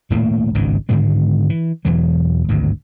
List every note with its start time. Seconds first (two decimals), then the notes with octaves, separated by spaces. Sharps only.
0.10 D#1 A2 A3 A#3
0.54 G#1 C#2 G2 D#3
0.89 G#2 D3 D#3 G#3
1.50 E3
1.85 E1 E2 E3 F#3
2.49 G#1 D2 G2